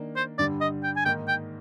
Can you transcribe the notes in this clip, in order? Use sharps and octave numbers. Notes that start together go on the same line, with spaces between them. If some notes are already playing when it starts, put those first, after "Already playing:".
Already playing: D#3 A#3 D4
C5
G2 D3 G3 D4 D5
D#5
G5
G#5
G#2 D#3 A#3 D#4 G5
G5